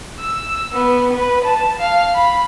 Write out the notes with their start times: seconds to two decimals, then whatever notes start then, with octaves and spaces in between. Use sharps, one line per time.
0.20 E6
0.73 B3
1.14 B4
1.45 A5
1.79 F5
2.14 B5